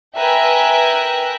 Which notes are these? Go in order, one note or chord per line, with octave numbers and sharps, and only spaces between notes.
A#4 B4 E5 G5 G#5 F#6